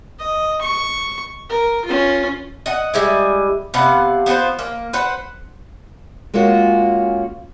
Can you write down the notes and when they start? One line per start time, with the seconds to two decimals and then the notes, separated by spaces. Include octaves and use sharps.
0.19 D#5
0.62 C#6
1.50 A#4
1.85 C#4 F4
2.66 D#5 F#5
2.94 G3 G#3 E4
3.74 C3 B3 F5 F#5
4.26 B3 F4 B4 C5
4.59 A#3
4.93 B4 C5 F#5
6.34 G#3 A#3 C#4 F4 F#4